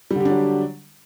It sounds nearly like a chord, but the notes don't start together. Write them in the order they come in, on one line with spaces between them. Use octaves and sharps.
G3 D3 G4 D4 F#3